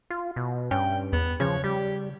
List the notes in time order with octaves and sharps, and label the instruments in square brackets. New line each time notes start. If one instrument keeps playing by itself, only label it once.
[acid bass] F4
B2
[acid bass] G2 [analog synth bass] C#4 [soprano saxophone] G5
[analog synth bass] E2 [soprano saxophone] B3
[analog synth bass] C#3 [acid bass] F3 [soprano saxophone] C#5
[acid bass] G3 [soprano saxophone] G4